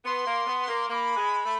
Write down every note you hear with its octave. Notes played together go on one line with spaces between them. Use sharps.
B3 C6
A#3
B3
A#3
A#3 B5 C6
G#3
A3